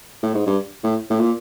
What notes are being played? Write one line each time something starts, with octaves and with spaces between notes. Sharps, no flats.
A2
G#2
G2
A2
A2
A#2